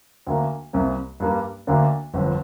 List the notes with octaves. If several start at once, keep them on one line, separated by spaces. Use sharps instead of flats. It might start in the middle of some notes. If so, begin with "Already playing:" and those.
D2 D3 A#3
C2 C3 A#3
G2 G3 A#3
D2 D3 A#3 D4
G1 F2 D3